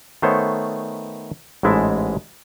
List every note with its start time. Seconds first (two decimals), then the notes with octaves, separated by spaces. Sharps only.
0.22 D#3 A3 B3 C5 C#5
1.63 A1 G#2 G#3 E4 E5 A5